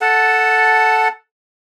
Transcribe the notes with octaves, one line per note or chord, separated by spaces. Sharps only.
A4 F#5 A5